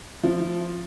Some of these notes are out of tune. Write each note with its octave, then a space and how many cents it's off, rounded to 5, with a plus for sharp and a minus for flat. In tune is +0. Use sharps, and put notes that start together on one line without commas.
F3 +0 E4 +45